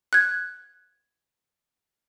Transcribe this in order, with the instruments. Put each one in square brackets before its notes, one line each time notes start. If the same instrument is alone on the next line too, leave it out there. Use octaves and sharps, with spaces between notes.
[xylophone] F#6 G#6